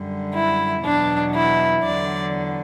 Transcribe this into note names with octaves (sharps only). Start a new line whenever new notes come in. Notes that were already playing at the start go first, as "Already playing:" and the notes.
Already playing: F#2 D3 G3
E4
E2 B2 F#3 D4
E4
E2 D3 F#3 D5